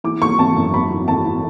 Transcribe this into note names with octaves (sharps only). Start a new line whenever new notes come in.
E3 D6
E3 C#6
G#1 A5
F#2
G#1 B5
E3
G#1 A5
E3